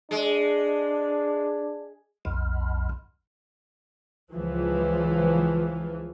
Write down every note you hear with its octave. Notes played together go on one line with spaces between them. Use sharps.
G#3 D4
B1 F2
C#2 E3 F3